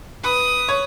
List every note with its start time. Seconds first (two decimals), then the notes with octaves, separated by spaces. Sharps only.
0.24 B4 D#6
0.68 C#5